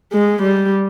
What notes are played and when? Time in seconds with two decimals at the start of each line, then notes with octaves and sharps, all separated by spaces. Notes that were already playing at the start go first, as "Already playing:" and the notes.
0.13 G#3
0.42 G3